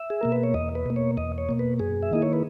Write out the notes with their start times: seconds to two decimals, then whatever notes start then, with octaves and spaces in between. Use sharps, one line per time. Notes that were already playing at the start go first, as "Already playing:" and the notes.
Already playing: E5
0.10 G#4
0.21 B2 A#3 A#4
0.32 B4
0.43 C#5
0.54 E2 D#5
0.75 B4
0.86 B2 A#3
0.96 C#5
1.17 E2 D#5
1.38 C#5
1.49 B2 A#3
1.59 B4
1.80 F#2 G#4
2.03 E5
2.11 D#3 A#3 E4 D#5
2.22 C#5
2.33 B4